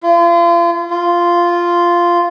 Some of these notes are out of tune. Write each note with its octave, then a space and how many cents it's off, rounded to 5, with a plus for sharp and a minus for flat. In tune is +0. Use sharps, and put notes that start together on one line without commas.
F4 -35
F4 -5